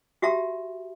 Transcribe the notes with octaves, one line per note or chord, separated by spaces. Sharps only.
F#4 G4 E5 A#5